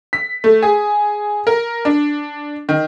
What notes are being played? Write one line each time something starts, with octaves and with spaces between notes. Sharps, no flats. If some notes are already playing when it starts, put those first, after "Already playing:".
B6
A3
G#4
A#4
D4
D#3